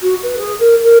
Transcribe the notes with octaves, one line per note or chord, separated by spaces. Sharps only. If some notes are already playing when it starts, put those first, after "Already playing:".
F#4
B4
G#4
A#4
A#4